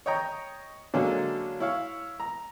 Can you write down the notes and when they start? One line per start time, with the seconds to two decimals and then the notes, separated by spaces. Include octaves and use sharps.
0.06 C#5 D#5 G5 A#5
0.94 D3 F#3 G#3 A#3 C#4 D4
1.60 E4 C#5 F5
2.20 A#5